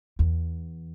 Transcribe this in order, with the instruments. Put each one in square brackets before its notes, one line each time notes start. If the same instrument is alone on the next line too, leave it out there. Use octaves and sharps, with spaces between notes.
[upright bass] E2